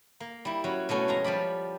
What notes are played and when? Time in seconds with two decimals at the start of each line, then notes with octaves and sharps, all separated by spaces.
0.20 A#3
0.45 G3 E4
0.64 F#3 C#4
0.89 B2 F#3 A3 C#4
1.08 F2 G#3 A#5
1.24 F3 G3 D5 B5